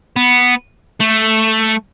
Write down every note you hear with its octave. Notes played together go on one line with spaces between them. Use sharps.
B3
A3